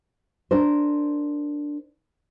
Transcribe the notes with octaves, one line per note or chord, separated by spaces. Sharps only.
D4 A#4 C5